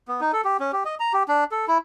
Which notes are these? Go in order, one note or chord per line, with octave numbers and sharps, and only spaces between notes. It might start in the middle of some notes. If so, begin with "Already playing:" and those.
B3
D#4
A4
G4
C#4
G4
D#5
A#5
G4
D4
A4
E4